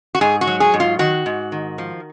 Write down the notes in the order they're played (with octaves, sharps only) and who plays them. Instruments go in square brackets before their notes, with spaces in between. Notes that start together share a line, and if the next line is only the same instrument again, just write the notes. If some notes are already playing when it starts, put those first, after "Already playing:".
[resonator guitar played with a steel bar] F#4
G#2 G#4
F#4
F#3
G#4
G#2
F4
D#3 F#4
G#2
D#3
F3